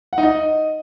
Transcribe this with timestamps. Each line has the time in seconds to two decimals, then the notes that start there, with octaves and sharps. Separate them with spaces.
0.13 F#5
0.18 D#4
0.23 D#5